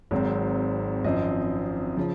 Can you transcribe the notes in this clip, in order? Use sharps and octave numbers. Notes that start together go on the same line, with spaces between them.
G#1 G#2 F#3 C4
G#1 F#2 F3 C4 D#5
C#3 F3